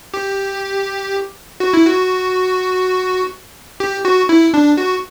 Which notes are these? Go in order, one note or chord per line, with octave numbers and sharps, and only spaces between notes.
G4
F#4
E4
F#4
G4
F#4
E4
D4
F#4